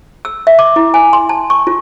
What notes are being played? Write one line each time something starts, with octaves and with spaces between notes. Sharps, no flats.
E6
E5
D6
E4
G#5
C6
A5
C#6
F4